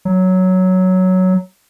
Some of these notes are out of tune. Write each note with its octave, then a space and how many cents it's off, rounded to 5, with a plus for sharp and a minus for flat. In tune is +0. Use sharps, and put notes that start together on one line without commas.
F#3 +5